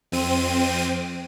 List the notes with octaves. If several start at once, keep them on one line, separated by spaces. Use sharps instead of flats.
F2 C4 D#7